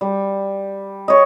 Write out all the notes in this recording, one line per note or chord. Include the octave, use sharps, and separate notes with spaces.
G3
C#5 D#5